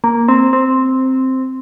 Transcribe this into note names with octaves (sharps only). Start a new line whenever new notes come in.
A#3
C4
C4